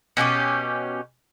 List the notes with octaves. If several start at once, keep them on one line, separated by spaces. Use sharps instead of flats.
B2 C#4 F#4 G4